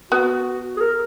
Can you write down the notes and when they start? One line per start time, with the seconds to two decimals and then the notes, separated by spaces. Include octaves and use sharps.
0.11 B3 F#4
0.77 G#4
0.81 A#4